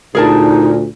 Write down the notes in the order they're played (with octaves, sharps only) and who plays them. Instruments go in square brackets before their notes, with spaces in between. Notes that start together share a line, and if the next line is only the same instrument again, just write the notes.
[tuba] D2 [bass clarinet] A#2 [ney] D#4 [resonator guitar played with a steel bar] G#4 A#4 A5